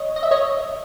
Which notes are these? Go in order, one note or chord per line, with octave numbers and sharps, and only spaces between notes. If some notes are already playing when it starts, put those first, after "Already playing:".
Already playing: C#5 D#5
D#5
E5
C#5 D#5